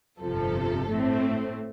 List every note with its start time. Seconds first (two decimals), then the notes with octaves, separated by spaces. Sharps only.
0.19 G1 F2 C3 F3 A4
0.88 A2 A3 C4